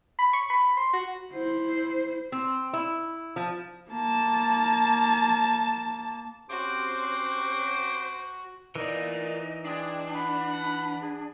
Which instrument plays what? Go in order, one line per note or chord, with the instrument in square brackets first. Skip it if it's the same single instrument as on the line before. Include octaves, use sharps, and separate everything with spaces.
[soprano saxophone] B5
C#6
B5
C6
F#4
[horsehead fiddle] E4 C5
[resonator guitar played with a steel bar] C4
E4
F3
[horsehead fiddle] A#3 A5
[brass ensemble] C4 C#4 G4 [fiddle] F#4 [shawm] C5 [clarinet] D6
[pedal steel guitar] E3 D#4 [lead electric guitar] A#4 D5 [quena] D#5
[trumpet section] G#3 G#4 D#6 [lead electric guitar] D4 [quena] G5
[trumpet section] F#5 [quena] B5
[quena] G#4